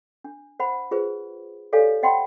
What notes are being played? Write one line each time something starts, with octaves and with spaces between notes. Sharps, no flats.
D4
C5 F#5 B5
F4 G#4 B4 C5
G4 A4 C#5 D5 F5 G#5
C5 D#5 F#5 G5 B5 C6